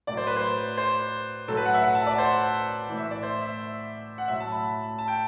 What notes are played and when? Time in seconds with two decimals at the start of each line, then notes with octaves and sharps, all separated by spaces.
0.07 A2 F#3 D5
0.17 C5
0.27 B4
0.37 C5
0.78 C5
1.48 A2 F#3 A4
1.57 B4
1.65 F#5
1.74 E5
1.83 F#5
1.95 A5
2.07 D5
2.18 C5
2.88 A2 E3
2.97 E5
3.11 D5
3.23 C5
3.41 E5
4.18 F#5
4.28 A2 F#3 E5
4.40 A5
4.52 B5
4.98 A5
5.08 G5